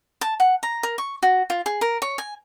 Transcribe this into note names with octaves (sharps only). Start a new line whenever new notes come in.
A5
F#5
A#5
A#4
C#6
F#4
F4
G#4
A#4
C#5
G#5